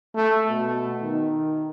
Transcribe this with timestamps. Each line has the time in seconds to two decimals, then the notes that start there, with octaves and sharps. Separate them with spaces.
0.15 A3
0.49 B2
1.02 D#3